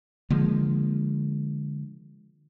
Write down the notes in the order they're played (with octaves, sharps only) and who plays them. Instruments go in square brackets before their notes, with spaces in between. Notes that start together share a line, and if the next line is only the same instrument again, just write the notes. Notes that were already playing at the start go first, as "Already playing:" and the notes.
[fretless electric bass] D3 F3 G#3 A#3